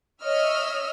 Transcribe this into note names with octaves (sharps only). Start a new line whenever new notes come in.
C#5 D#5 E5 E6 F6